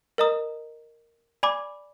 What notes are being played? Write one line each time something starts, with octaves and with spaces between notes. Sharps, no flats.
A#4 D#5 A#5 D#6
D5 G#5 B5 D6